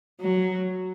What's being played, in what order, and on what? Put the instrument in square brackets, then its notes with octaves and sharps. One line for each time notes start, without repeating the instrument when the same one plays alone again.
[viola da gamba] F#3